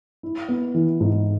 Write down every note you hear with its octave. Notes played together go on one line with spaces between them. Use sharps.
E4
B3
E3
G#2